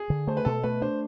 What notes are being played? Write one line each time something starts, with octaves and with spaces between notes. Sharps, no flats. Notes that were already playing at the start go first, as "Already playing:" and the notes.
Already playing: G#4
D3
A3 C5
B4
B2 A4
A3 B4
D4 C5